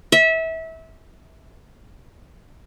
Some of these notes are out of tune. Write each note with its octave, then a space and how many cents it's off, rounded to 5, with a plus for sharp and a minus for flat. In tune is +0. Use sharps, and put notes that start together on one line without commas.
E5 -25